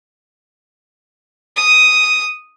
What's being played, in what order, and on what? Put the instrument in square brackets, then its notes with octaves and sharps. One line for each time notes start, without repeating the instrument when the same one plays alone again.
[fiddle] D#6